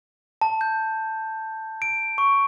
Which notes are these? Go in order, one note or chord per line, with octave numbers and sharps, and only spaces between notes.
A5
G6
D7
C#6